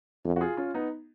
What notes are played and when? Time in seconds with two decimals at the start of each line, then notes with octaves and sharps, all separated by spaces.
0.25 F2
0.36 F#4
0.41 F4 G#4
0.57 C#4 F4
0.74 B3 D#4